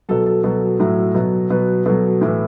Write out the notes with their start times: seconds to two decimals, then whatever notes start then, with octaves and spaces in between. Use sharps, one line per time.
0.09 B2 F#3 A4
0.26 A4
0.43 B2 F#3 A4
0.79 A2 F#3
1.14 B2 F#3
1.50 B2 F#3 B4
1.85 B2 F#3 A4
2.21 A2 E3